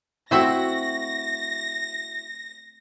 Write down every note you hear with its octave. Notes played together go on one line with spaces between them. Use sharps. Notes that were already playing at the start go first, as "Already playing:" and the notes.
A3 C4 E4 F#4 E5 A#6